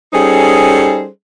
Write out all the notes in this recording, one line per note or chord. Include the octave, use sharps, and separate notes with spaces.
G3 C#4 D#4 G#4 A4 C5